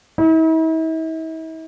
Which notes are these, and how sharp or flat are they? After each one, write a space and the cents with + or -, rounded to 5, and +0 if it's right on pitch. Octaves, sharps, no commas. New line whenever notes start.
E4 -45